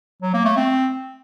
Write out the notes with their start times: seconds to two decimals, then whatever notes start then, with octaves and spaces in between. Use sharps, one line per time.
0.22 F#3
0.34 A#3
0.45 A3
0.57 C4